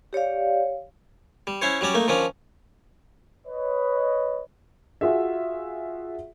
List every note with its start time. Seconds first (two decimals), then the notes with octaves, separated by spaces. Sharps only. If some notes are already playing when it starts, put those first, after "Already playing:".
0.13 G4 C#5 D5 F5
1.47 G3
1.62 C#4 E4 C5 C#5
1.81 F#3 G3 C#4 D5
1.94 A3 A#3 D#4
2.08 D#3 F3 C#4 D4
3.47 B4 C#5 D#5
5.01 F4 F#4 G#4 E5